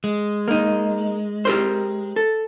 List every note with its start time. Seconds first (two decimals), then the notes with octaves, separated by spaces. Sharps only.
0.04 G#3
0.48 A#3 D#4
1.45 G4 A#4 C5
2.16 A4